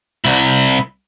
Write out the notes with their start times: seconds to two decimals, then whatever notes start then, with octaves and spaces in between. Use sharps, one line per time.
0.25 C2 E4